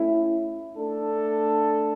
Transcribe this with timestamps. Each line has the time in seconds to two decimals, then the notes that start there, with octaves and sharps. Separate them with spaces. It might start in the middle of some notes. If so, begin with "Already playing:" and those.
Already playing: A3 C#4 E4
0.77 A3 D4 A4